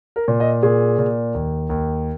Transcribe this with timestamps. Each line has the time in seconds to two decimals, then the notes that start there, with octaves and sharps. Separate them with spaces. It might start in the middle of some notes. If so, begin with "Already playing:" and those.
0.16 A#4
0.28 A#2
0.40 D#5
0.63 A#2 G#4
0.99 A#2
1.34 D#2
1.70 D#2